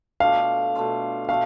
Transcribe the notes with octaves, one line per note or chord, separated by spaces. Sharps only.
B2 A3 D4 F4 F5
B2 A3 D4 F4
B2 A3 F5